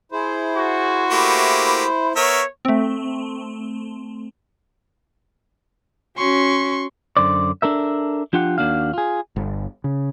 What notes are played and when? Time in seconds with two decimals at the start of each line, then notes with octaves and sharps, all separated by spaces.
0.12 E4 G#4 C5
0.57 F#4
1.11 A3 A#3 G4 B5
2.16 B3 A#4 C#5 E5 C#6
2.65 A3 C4
6.18 C#4 F#4 C6 C#6
7.17 F#2 D3 C5 D5
7.62 D4 A4 A#4 E5
8.33 F3 D4 F4 G4 F#5
8.58 D#2 A#3 D4 F#4 F5
8.94 F4 G#4
9.36 G1
9.84 C#3